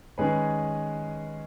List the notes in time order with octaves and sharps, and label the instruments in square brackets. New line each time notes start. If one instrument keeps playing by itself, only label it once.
[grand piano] D#3 G#3 C#4 G#4 B4